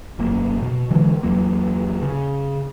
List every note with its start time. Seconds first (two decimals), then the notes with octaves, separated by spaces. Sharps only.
0.19 E1 F#2 A#3
0.62 B2
0.91 D3 E3 F#3 G#3
1.23 E2 F#3 A#3
2.02 C#3